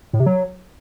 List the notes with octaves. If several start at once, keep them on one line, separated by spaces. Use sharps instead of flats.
A2
C3
F#3